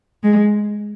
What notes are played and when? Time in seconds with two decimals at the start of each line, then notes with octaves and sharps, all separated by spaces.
0.24 G#3